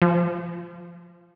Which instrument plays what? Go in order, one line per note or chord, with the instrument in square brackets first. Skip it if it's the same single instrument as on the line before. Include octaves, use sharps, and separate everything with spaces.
[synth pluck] F3